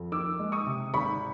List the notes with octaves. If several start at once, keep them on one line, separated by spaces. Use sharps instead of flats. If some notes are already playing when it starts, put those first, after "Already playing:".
Already playing: F2
D#3 D6 E6
G#3
C#6 D#6
C3
G#1 B5 C#6